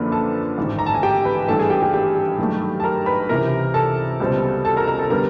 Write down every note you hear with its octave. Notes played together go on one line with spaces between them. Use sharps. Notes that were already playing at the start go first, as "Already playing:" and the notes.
Already playing: F#2 D3 F3 A#3 D4 B4
A4 A5
A1 G#2 D#3
A#5
A5
G#5
G4 G5
B4 B5
G#1 G2 E3 A3 D4 A4 A5
G#4 G#5
G4 G5
G4 G5
G4 G5
G2 D#3 F#3 A3
A5
A#4 A#5
B4 B5
C#2 C3 E3 A#4 A#5
A4 A5
C#2 B2 G3 C4
A4 A5
A#4 A#5
A#4 A#5
A4 A5
D3 G3 B3 A#4 A#5